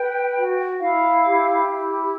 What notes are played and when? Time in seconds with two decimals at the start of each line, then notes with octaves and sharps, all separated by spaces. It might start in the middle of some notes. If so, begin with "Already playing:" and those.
Already playing: B4 G5
0.37 F#4
0.80 E4 F5
1.24 G4
1.68 E4